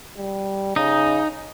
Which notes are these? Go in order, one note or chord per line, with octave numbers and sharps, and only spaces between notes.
G3
C#3 D#4